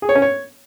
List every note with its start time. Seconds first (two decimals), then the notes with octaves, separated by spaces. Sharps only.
0.02 G#4
0.09 C#5
0.15 C#4
0.22 C#5